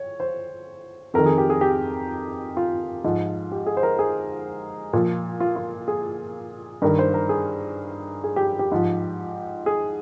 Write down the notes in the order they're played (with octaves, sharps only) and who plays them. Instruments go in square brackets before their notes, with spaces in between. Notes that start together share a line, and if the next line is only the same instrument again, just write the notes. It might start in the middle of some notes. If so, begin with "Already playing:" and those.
Already playing: [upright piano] C#5
C5
F2 A#4
D#3
G#4
G4
G#4
G4
F4
G#2 F3
G4
G#4
C5
A#4
G#4
A#2 F3 F4
F4
F4
G#4
G2 D#3 A#4
C5
A#4
G#4
G#4
G4
G4
G#2 F3
G#4